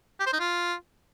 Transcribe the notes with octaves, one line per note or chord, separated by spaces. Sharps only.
G4
C5
D#4
F4